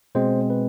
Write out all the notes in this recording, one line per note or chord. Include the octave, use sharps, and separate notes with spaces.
B2 G#3 C4 C5
B4